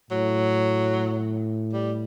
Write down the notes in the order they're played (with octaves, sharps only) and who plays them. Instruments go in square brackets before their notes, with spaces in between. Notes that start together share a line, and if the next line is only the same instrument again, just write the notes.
[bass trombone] A2 [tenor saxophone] F#3
[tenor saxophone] G3